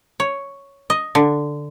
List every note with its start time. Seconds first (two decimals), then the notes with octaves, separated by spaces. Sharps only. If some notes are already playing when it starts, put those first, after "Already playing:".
0.20 C#5
0.90 D#5
1.15 D3